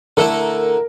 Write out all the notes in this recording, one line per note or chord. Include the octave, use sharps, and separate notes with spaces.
D3 A3 E4 A#4